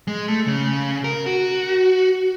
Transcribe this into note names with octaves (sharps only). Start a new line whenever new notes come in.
G#3
A3
C#3
A#4
F#4